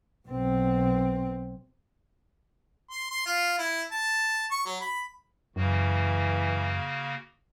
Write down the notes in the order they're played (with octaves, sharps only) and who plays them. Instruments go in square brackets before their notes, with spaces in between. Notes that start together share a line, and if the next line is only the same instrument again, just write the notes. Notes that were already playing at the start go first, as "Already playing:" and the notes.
[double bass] B1 C4
[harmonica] C6
C6
F4
E4
A5
C#6
F#3
B5
[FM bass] F#2 [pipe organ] C#3 A#3 F#4 [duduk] E3